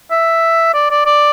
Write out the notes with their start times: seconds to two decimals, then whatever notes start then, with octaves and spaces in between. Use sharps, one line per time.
0.11 E5
0.74 D5
0.91 D5
1.06 D5